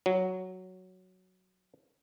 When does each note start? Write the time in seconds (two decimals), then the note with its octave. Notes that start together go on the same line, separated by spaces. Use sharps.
0.06 F#3